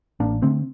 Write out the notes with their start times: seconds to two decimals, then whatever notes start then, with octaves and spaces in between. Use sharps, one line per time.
0.20 A1 A#3 D4
0.42 D3 A3 C4